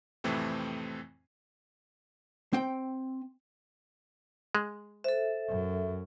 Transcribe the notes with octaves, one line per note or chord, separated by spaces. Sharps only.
F2 A2 C3 E3 A3 C4
C4 G5
G#3
A4 C5 E5
F#2